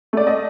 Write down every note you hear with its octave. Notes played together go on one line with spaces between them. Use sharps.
A3 D5
D#5